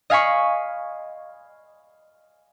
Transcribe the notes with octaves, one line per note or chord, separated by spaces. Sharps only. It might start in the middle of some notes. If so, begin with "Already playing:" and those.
D#5 F5 G#5 B5 C#6